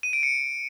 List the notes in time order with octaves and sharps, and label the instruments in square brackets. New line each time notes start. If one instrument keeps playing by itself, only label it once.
[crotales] D#7
D7
C#7